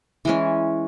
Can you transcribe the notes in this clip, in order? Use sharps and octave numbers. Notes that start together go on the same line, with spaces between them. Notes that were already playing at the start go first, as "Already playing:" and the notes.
E3 G#3 C#4